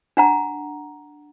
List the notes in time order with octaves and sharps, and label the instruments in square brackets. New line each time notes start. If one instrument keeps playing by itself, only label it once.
[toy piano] D4 F#5 A#5